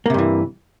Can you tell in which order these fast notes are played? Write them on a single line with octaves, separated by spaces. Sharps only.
A#3 C3 G2 E3